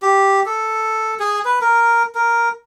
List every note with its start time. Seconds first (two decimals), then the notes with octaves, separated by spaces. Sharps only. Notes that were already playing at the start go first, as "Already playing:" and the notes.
0.02 G4
0.46 A4
1.20 G#4
1.45 B4
1.61 A#4
2.15 A#4